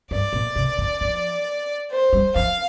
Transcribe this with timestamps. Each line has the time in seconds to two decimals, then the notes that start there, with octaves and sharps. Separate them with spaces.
0.11 G2 D5
0.33 A#2
0.56 C3
0.78 D3
1.01 F3
1.91 C5
2.13 G3
2.36 F3 F5